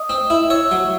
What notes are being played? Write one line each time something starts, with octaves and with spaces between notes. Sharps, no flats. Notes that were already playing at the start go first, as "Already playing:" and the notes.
Already playing: D#5 D#6
C4
E4
C#5 E5 E6
F#3